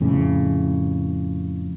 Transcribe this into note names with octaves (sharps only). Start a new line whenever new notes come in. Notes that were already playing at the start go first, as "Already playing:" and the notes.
F2 A2 C#3